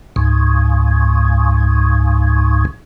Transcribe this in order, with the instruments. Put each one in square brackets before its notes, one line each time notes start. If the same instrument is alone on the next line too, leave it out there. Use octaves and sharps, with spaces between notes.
[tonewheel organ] C#2 G#2